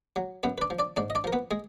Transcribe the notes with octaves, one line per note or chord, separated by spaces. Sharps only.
F#3
F#2 B3 B4
B4
D4 D5
F3
D4 D5
G#2 D4 D5
D#5
D4 D5
F3 A#4
B3 B4
G#3 G#4